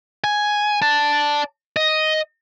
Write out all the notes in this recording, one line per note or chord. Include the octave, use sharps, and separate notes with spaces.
G#5
D5 A5
D#5